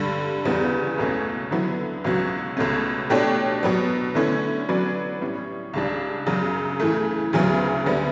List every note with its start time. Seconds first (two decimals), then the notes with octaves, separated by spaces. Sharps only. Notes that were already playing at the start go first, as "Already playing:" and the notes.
Already playing: G2 D3 G3
0.45 E2 C#3 G3 B3
0.98 C#2 B2 A3 C#4
1.51 D3 F#3 B3 E4
2.04 C#2 B2 F#3 C#4 F#4
2.57 C#2 B2 A3 C#4
3.10 B2 A3 D4 G4 C#5
3.63 B2 F#3 B3
4.15 D3 A3 C#4 E4
4.68 F#3 C#4 F#4 B4 D5
5.21 A2 G3 C#4
5.74 C#2 C#3 G3 D4
6.27 F#2 C#3 F#3
6.80 C#3 E3 A3
7.33 D2 C#3 F#3 B3
7.86 D2 D3 G3 B3